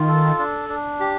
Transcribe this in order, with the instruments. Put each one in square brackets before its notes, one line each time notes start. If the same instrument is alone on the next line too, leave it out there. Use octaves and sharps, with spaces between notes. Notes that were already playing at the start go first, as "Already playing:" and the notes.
Already playing: [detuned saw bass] D#3 [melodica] F4
[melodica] A4
D4
D4
G4